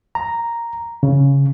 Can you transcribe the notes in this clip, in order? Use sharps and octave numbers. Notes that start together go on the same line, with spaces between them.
A#5
C#3